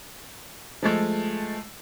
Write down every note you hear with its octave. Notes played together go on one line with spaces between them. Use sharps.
F3 G#3 A3